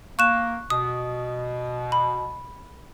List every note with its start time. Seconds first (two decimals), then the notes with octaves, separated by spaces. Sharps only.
0.19 A#3 C#6 F#6 E7
0.70 B2 D#6
1.92 B5